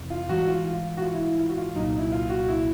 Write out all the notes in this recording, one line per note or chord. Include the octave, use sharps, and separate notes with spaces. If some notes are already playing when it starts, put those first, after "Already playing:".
Already playing: F2 C3 E3
F4
G#2 E3 G3 F#4
F4
F4
F#4
F4
E4
E4
F4
F#4
F4
C2 A#2 F#3 D#4
E4
F4
F#4
E4